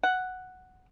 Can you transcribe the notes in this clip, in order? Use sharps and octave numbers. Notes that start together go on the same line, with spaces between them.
F#5